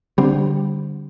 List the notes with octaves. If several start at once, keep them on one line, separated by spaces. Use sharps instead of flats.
D3 G3 C4